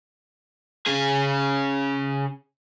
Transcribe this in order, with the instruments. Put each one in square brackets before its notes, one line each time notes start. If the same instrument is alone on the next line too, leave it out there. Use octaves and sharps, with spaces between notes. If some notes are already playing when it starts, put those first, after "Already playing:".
[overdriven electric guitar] C#3 G#4